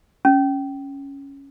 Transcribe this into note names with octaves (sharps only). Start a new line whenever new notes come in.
C#4